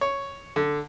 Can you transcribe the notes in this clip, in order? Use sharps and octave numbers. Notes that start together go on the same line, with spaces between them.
C#5
D3